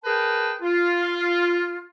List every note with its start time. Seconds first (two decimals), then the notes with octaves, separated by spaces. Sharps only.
0.05 G#4 A#4 B4 G5 A5
0.62 F4